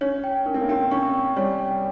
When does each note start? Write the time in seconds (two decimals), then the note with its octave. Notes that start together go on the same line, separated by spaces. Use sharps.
0.01 C#4 C#5
0.24 G5
0.46 C#4 A#4
0.54 C4
0.61 A#3
0.69 C4 G5
0.91 C#4 C#6
1.14 G5
1.37 G3 C#5
1.59 G5